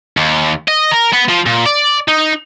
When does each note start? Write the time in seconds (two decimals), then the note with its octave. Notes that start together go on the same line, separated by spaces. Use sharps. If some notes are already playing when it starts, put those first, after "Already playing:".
0.17 D#2
0.68 D#5
0.92 A#4
1.13 B3
1.29 F3
1.46 A#2
1.66 D5
2.08 D#4